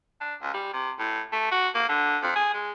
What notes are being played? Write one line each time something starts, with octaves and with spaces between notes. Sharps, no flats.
D4
C#2
G3
C3
A2
A3
F#4
A#3
D3
F2
G#4
G#3